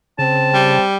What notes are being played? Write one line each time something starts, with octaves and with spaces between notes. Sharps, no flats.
C#3 C4 A5
G3